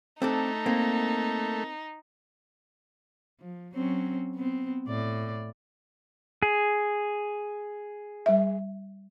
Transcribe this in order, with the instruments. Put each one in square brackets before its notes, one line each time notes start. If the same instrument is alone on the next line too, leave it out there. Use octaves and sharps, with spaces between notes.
[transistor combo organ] A3 [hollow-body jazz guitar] C4 D4 A4 [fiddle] D#4
[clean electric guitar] A#3 [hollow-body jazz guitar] C4
[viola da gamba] F3
F#3 C4 C#4
B3 C4
A2 D5
[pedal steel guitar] G#4
[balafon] G3 E5